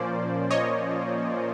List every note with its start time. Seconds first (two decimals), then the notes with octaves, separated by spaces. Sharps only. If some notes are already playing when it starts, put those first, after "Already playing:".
Already playing: A#2 F3 A#3 C#4 C5 D5
0.51 C#5 D#5